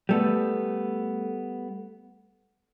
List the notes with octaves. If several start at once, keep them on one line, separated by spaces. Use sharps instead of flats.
G3 A3 B3